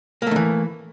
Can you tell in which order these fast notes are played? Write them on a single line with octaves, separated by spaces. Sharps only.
A#3 A3 D#3 E3